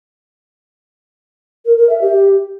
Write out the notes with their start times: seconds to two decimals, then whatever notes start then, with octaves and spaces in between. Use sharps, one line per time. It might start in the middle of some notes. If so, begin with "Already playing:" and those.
1.65 A#4
1.77 A#4
1.89 E5
2.01 G4